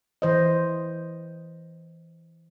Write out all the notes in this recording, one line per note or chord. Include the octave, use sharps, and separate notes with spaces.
E3 C5 D#5